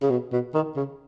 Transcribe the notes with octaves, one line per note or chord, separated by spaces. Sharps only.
C#3
B2
B2
D#3
C#3